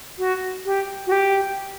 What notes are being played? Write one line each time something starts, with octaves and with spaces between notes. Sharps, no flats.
F#4
G4
F#4
G4